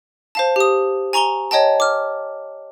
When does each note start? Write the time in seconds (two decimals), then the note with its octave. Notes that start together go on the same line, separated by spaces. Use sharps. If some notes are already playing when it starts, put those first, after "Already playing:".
0.35 C5 F5 A5
0.56 G4 D#6
1.13 G#5 A#5 C#6 F7 G7
1.51 C#5 D#5 G5 A5
1.80 D6 F6